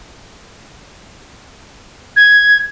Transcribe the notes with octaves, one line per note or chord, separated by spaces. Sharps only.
G#6